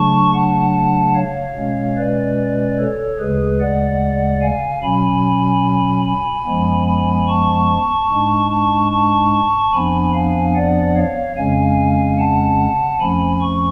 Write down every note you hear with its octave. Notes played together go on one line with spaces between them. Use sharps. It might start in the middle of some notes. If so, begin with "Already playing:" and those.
Already playing: C#3 F#3 A3 D4 A5 C#6
F#5 A5
C#5 F5
B2 G#3 C#4
B4 D5
A4 C#5
D2 C#3 G#3 G#4 B4
D5 F#5
F5 G#5
B2 F#3 C#4 G#5 B5
G#5 B5
F#2 F3 G#3 B3
G#5 B5
A5 C#6
G#2 G#3 D4
A5 C#6
A5 C#6
F2 F3 B3 D4 G#5 B5
F5 G#5
D5 F#5
C#5 F5
F2 C#3 G#3 C#4 F5 G#5
F#5 A5
F2 F3 A3 C#4 G#5 B5
C#6